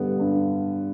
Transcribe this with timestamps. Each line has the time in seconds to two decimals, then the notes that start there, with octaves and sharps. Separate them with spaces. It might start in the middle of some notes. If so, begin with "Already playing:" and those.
Already playing: G2 D3 G3 B3
0.20 G2